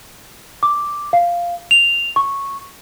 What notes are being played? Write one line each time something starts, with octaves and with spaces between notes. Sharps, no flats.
D6
F5
F7
C#6